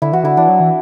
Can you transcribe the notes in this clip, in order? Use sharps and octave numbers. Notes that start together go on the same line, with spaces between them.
D3 E4
E3 F#4
D3 E4
E3 D4
F#3
E3